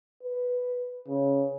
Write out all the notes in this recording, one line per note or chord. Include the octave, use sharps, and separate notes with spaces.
B4
C#3